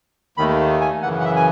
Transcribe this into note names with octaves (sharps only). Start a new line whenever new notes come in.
D#2 D#3 A3 B5
G#5
F#2 C#3 E3 F#5
F#5
E5
G#5